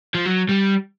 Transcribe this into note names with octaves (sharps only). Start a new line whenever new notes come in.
F3
F#3
G3